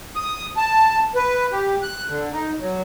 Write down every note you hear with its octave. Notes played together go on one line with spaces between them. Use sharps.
D#6
A5
B4
G4
F#6
D3
D#4
F#3